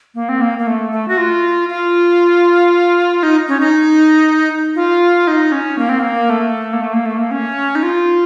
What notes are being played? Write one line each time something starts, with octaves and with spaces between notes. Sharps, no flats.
A#3
C4
A#3
A#3
A3
A3
F#4
F4
F4
D#4
C#4
D#4
F4
D#4
C#4
A#3
C4
A#3
A3
A#3
A3
A#3
A3
A#3
C#4
D#4
F4